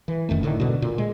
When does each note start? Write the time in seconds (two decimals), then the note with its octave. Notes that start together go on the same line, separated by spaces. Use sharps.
0.08 E3
0.29 F1 F#2 D#3 A3
0.43 A2 D3 D#3
0.60 B2 D3 G#3
0.82 A#2
0.98 G#3